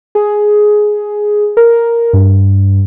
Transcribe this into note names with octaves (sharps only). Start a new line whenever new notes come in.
G#4
A#4
G2